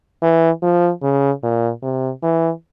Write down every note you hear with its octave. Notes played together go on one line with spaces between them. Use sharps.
E3
F3
C#3
A#2
C3
E3